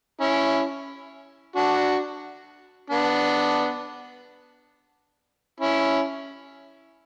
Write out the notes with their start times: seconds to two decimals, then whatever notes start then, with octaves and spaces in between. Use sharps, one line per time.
0.21 C#4 E4
1.56 D4 F#4
2.90 B3 D4
5.60 C#4 E4